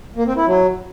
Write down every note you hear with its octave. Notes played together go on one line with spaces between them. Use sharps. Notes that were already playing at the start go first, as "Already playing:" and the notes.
A#3
C4
E4
F#3